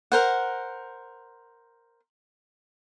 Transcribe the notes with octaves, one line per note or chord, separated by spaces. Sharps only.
A#4 C5 F#5